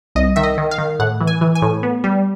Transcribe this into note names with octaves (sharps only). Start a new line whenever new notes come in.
C2 D#5
D#3 E5
D#5
D#3
F5
D#3
A2 F#5
E3
G#5
E3
G#5
A2
B3
G3